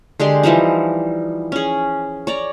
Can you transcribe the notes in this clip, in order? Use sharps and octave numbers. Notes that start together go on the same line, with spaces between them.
D3 G#3 G4 C6
E3 F3 G3 D#4
C#4 G#4
C#5 D5 A#5